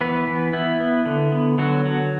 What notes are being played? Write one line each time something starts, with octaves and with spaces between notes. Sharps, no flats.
E3 B3 B4
E3
B3 E4
B3
D3
B3
D3 F#3 F#4
F#3